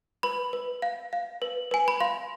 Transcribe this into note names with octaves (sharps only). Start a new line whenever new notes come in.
B4 B5
B4
F5
F5
B4
B4 G#5
B5
F5 C6